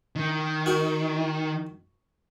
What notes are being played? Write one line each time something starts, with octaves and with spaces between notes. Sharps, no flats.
D#3
F#4 A#4